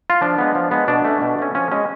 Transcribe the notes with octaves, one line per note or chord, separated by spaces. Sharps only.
F4
F3 D4
G#3 B3
F3
G#3 B3
B2 D4
A3 C#4
B2
A3 C#4
F3 C#4
G#3 C#4